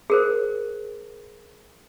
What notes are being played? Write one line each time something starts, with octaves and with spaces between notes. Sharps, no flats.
G#4 A#4 C5